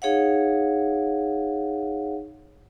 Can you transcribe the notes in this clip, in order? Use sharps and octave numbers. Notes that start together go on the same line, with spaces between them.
D#4 G#4 C#5 F5 F#5